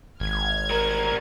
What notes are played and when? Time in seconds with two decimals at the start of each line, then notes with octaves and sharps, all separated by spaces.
0.20 G#1 F6 G#6
0.70 G3 A#4 A#5